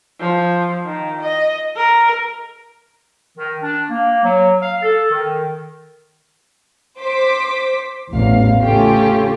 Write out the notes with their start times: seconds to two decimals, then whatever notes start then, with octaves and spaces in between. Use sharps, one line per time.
0.20 F3
0.85 D#3
1.21 D#5
1.76 A#4
3.37 D#3
3.62 D4
3.90 A#3
4.23 F#3
4.61 F5
4.82 A4
5.10 D#3
6.98 C5 D6 B6
8.11 A1 E2 F5
8.62 C#3 A3 C#4 F4 G4